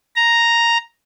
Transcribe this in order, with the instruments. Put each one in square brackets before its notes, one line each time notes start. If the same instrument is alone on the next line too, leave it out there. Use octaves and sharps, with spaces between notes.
[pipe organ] A#5